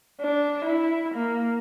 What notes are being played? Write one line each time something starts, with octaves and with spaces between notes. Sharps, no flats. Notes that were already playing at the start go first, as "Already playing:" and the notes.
D4
E4
A#3